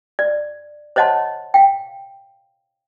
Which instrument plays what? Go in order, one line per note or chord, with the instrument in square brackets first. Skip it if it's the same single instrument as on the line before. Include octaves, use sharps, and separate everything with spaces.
[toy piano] D5
C5 C#5 D#5 F#5 A5 C6
F5 G5